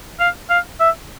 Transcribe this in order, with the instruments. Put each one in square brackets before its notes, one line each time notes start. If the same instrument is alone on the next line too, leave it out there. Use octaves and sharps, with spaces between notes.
[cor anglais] F5
F5
E5